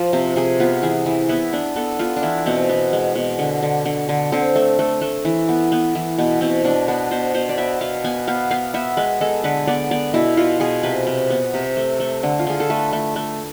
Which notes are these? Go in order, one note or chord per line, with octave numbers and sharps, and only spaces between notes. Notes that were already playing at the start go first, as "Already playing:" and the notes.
Already playing: F3 F4
C3 C4
C3 G#4
B3 F4
E3 G#4
E3
B3 E4
B3 D4
B3 A4
B3 F4
D4
E3 E4
B2 C4
B3
G#3
B2
D3
D3
D3
D3
D3 C4
A3
A3
A3
E3
B3
B3
E3
B2 B3
B2 C4
B2 D4
B3 D4
B2 C5
B2 C5
D5
B3 E5
B2 F5
B3 G#5
B3 F5
B3 F5
B3 E5
G#3 B4
G#3 A4
D3 B4
B3 D5
B3 D5
B2 E4
B2 F4
B2 G#4
C3 B4
C3
B3
C3
A3
A3
D3
F4
D3 G#4
A4
A3 B4
A3
A3